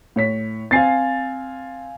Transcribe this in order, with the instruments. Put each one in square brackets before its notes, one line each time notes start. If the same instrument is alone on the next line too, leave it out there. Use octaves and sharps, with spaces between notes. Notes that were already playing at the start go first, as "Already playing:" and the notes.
[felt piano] A2 C#5 B6
[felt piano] C4 C7 [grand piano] F5 G#5 A6